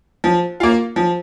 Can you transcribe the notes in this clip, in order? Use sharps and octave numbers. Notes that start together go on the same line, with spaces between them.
F3
A#3 F4
F3